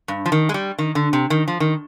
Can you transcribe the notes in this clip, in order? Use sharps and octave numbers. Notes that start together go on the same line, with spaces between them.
G2
F3
D#3
G#3
G3
D#3
D3
C3
D#3
F3
D#3